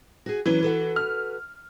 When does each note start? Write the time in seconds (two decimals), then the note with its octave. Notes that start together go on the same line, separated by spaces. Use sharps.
0.26 F#4 G#4
0.46 E3 F#3 C#4 B4
0.63 F#4 A4 B4
0.96 F6